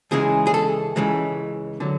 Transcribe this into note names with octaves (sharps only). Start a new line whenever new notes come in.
C#2 C#3 E3 G#3 G#4
G#4
A4
C#2 C#3 E3 G#3
D3 F#3